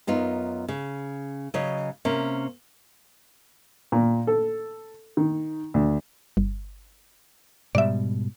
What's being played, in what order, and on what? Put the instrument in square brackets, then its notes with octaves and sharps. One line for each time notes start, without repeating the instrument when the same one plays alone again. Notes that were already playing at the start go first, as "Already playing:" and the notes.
[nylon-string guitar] F#2 B3 D#4 F4
C#3
C#3 F#3 C#5 D#5
C3 A#3 C#4
[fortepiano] A#2
A4
D#3
D2
[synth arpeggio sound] G1
[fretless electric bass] G#2 B2 G3 [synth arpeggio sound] D5 E5